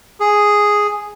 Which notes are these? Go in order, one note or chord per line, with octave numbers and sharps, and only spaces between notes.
G#4